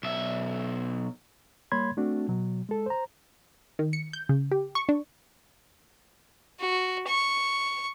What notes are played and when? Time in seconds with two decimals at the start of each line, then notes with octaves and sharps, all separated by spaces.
0.03 B1 E5
1.72 G3 A#3 C#5 B5 C6 G#6
1.97 A3 C4 D4 F#4
2.29 B2 F#3
2.69 G#3 A4
2.86 C5 A#5
3.79 D#3
3.93 C#7
4.13 G6
4.29 C#3
4.52 G4
4.75 C#6
4.89 D4
6.59 F#4
7.07 C#6